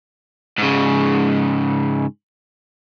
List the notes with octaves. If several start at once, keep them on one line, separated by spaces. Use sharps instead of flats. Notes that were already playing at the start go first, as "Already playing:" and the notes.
G#2 C#3